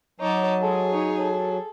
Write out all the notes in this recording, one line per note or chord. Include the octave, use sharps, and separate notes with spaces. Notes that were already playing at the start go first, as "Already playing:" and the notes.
F#3 D#4 C#5 A5 D6
G#3 G#4 A4
D#4 C#5
A4